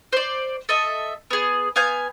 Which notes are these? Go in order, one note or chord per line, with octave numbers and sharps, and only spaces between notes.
C5 D5
A4 D#5 E5
B3 G#4
B3 F5 G#5 G6